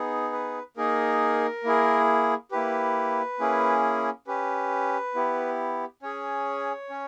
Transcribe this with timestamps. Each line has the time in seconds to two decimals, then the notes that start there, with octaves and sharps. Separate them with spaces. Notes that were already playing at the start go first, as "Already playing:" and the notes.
Already playing: B3 D#4 G#4
0.32 B4
0.77 A#3 D#4 G#4 A#4
1.64 A#3 E4 G#4
2.51 A#3 E4 G4 B4
3.39 A#3 C#4 E4 G#4
4.27 C#4 G4 B4
5.15 B3 E4 G4
6.02 C#4 G#4 C#5
6.90 C#4